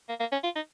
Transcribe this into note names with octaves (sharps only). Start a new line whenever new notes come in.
A#3
A#3
C#4
F4
D#4